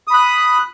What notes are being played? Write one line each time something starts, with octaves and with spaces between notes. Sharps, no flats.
B5 D#6 F#6